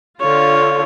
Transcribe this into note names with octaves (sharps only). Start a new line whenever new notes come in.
D3 F4 C#5